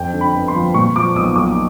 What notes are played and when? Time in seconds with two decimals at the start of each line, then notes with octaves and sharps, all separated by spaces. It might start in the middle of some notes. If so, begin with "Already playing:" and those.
Already playing: F2 G5
0.14 D3
0.21 B5
0.34 G1
0.48 C6
0.55 F3
0.74 A#2 C#6
0.96 F3 D6
1.16 B1 D#6
1.35 B1 D6